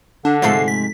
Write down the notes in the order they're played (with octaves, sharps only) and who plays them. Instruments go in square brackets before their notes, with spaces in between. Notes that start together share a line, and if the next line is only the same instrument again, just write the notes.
[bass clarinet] D3 [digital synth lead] D4
[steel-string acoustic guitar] G#2 C3 G#3 [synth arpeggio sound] F3 A3 A4 [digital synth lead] C7
[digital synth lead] B6